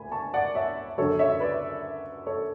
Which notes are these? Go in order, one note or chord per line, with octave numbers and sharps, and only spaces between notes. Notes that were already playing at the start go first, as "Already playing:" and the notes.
Already playing: D2 G#5 B5
A5 C#6
D5 F#5
C#5 E5
F#2 D3 F#3 A4 C#5
C#5 E5
B4 D5
A4 C#5